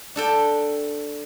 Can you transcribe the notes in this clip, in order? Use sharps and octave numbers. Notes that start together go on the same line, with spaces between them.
D4 A4 G5